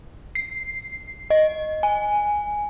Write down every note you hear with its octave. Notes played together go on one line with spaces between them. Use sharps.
C7
D#5
G#5